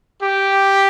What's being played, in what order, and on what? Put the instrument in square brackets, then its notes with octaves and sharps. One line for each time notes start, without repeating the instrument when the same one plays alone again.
[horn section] G4